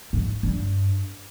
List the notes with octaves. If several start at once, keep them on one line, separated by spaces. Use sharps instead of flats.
G#2
G2